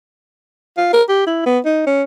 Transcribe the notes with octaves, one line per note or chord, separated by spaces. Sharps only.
F4
A#4
G4
E4
B3
D#4
C#4